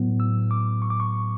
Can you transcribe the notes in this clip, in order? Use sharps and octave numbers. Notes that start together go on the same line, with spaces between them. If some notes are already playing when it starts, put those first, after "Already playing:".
Already playing: A2 F#3 B3
E6
D6
C#6
D6
C#6